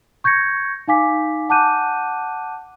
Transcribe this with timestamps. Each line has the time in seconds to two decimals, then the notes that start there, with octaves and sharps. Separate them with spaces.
0.24 C#6 G6 G#6 A#6 C#7
0.88 D#4 F5 G#5 D6 B6
1.49 F#5 A5 D6 F#6 G6 D#7